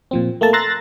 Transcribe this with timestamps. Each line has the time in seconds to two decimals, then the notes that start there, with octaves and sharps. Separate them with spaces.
0.11 A#2 F3 C4
0.41 A3 A#3 A4 A5
0.53 A#5 C6 E6 F#6 A6 A#6